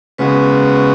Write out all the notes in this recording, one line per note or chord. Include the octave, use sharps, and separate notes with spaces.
C#3 G#3 B3 F#4 B4